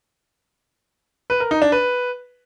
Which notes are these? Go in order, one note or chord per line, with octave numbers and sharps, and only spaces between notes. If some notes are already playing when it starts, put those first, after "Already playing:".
B4
A#4
D#4
D4
B4